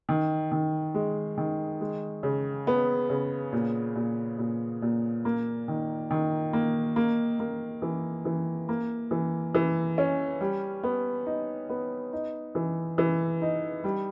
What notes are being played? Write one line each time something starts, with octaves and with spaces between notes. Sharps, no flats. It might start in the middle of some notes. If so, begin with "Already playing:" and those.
D#3
D#3
G#3
D#3
G#3
C#3
B3
C#3
A#2
A#2
A#2
A#2
A#3
D#3
D#3
A#3
A#3
A#3
E3
E3
A#3
E3
E3
C#4
G3
B3
D#4
B3
D#4
E3
E3
D#4
G3